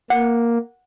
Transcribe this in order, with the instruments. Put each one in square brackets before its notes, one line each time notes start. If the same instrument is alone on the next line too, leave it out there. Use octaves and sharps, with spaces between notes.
[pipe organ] A#3 [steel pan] F#5